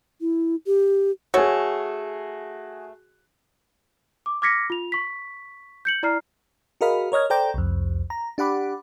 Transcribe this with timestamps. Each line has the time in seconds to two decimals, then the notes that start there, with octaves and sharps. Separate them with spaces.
0.21 E4
0.67 G4
1.34 A3 F#4 G#4 A4 C#5
4.26 D6
4.42 D6 F6 G#6 A#6 B6 C#7
4.70 F4 F7
4.92 C#6 B6
5.85 G6 C#7 F#7
6.03 E4 D5 A#5 F6 C7
6.81 F#4 G#4 A#4 D#5 F5 B5
7.12 A#4 C#5 D#5 F6 G#6
7.30 A4 C5 D5 G5 A#5
7.54 C2 F2
8.10 A#5
8.38 D4 G4 F#5 B5 D6